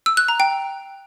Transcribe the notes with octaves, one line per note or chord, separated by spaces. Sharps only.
E6
F#6
A#5
G5